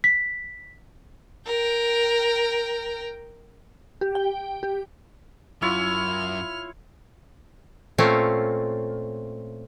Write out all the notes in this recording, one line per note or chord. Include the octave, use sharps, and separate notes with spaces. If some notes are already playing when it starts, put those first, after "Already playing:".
B6
A#4 G5
G4
G5
G4
F#2 E4 F4 C#5 F6
A#2 A3 C4 C#4 F4